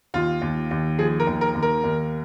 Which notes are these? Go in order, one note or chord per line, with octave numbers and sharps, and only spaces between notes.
D#2 F4
D#2
D#2
F3 G#4
A#4
D#2
A#4
D#2
A#4
D#2